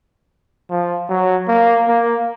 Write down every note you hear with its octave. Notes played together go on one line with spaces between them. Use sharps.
F3
F#3
A#3
A#3